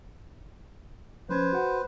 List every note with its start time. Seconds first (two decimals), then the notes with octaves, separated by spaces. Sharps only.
1.29 F3 C#4 B4 C5 G#6
1.53 F#4 F#5